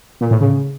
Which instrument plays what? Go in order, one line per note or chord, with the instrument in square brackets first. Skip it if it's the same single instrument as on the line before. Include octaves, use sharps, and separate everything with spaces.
[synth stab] A#2
A2
C#3